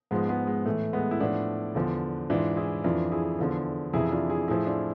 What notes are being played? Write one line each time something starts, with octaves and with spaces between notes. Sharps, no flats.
G#2 F3 G#3 B3
G#3 B3
G#3
A2 E3 A3
G#3 B3
E4
A2 F3 B3 D4
E2 D3 F3
G#2 E3 D4 F4
E4 G#4
F2 E3 D4 F4
E4 G#4
E2 D3 F3
F2 C3 E3 E4 G#4
D4 F4
E4 G#4
A2 F3 E4 G#4
D4 F4